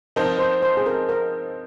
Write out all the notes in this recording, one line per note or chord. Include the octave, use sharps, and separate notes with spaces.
F3 C4 D#4 A#4
C5
C5
G#4
A#4
A#4